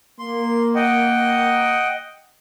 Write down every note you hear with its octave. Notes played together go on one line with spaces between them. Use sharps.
A#3 C6
D#5 F#5 G5